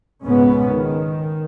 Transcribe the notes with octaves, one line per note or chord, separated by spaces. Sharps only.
C#2 G#2 B2 B3 C#4
D#3